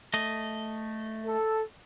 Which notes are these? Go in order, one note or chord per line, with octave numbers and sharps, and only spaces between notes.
A3 D#5
A4